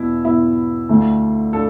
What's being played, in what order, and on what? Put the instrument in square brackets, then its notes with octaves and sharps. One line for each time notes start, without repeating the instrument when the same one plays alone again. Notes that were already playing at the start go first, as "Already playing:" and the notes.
Already playing: [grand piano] E2 B2 B3 [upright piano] E4
[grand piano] E2 B2 B3 [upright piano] E4
[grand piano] D2 D3 A3 D4 F4
[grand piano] D4 F4 [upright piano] A4